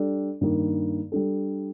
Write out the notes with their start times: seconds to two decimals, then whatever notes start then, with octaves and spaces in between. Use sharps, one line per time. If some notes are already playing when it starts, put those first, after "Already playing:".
Already playing: G3 D4 A4 D5
0.41 G2 D#3 A#3
1.12 G3 D4 A4